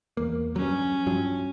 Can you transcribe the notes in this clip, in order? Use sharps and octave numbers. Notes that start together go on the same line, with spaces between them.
E2 A#3
G2 F#3 C#4
G2 F3 F#3